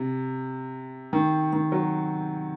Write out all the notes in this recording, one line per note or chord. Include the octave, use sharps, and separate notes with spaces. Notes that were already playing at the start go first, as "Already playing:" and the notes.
Already playing: C3
D#3
D#3
F#3